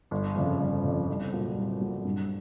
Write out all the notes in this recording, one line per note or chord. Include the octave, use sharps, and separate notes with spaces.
G1
F2 C#3
G1
F2 C#3
C2
A#2 F#3
C2
A#2 F#3
G2